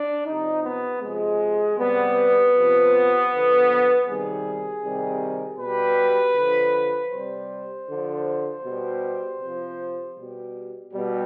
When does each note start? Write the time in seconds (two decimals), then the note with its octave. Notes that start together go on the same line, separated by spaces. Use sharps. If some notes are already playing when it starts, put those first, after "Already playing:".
Already playing: D4
0.26 C3 F3 D#4
0.63 B3
1.01 C3 F3 G#3
1.78 C3 G3 B3
2.54 C3 F3
3.30 D3 F3
4.06 C3 D#3 G3 G#4
4.83 C3 D#3 G3
5.59 B2 G3 B4
6.35 D3 F3
7.11 C3 G3 C5
7.87 D3 F3
8.64 B2 G3
9.40 C3 F3
10.16 B2 G3
10.93 B2 G3